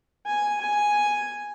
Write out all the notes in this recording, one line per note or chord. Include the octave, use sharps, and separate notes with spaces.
G#5
G#5